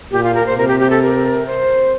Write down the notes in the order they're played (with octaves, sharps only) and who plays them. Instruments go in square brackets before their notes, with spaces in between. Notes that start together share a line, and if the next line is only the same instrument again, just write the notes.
[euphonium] A#2 [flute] G4
[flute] F4
A#4
C5
[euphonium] C3 [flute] A#4
[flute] G4
G4
A4
A#4
C5